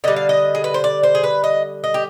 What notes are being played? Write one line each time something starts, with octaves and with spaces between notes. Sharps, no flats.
D3 G3 D#5
F5
D#5
G#4
B4
C5
D5
C5
G#4
B4
D#5
D#5
G4